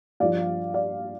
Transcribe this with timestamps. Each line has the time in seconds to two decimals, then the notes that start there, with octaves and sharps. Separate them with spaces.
0.20 G2 F3 D5 F5
0.74 D5 F5